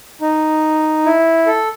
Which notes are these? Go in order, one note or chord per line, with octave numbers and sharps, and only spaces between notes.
D#4
E4
A4